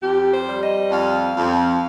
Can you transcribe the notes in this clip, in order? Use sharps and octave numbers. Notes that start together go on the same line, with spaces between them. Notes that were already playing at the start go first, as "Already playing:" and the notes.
F2 G4
C5
G3
D#5
F2 F5
F2